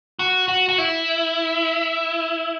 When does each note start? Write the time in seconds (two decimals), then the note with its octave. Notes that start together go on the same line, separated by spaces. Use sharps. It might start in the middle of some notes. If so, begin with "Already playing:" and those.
0.19 F#4
0.48 F#4
0.69 F#4
0.78 E4